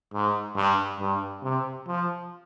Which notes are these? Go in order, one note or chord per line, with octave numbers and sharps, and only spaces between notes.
G#2
G2
G2
C3
F3